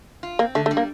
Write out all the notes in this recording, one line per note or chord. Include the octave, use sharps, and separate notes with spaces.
F4
A#3 C4
D3 A3
A3
G3
A#3